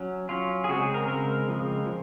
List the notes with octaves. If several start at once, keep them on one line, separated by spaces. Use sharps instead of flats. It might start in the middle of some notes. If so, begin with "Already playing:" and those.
Already playing: F#3 C#4
F#3 C#4 F4
G#4
C#3 G#3 C4 F#4
G#4
A#4
C#3 G#3 C4 A#4
C#3 F3 G#3 C4
C#3 F3